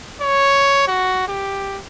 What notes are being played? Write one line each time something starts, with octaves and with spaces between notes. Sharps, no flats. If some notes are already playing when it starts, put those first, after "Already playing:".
C#5
F#4
G4